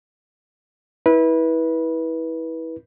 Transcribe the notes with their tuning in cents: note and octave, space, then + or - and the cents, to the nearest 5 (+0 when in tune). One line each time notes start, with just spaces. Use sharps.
E4 -25 B4 -20